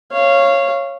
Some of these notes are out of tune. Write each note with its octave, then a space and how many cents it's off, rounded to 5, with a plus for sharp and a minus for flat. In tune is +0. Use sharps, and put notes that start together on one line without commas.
C#5 -10 F5 -20